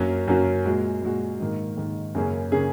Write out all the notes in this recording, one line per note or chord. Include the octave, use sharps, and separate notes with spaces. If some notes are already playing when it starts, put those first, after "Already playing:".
Already playing: F#2 F#3 A#3 C#4 F#4
F#2 F#3 A#3 C#4 F#4
A#2 G#3 F#4
A#2 G#3 F#4
G#2 D#3 A#3
G#2 D#3 A#3
F#2 C#3 A#3 C#4 G#4
C#3 A#3 C#4 G#4